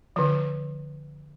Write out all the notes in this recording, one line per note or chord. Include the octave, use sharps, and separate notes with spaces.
D3 F3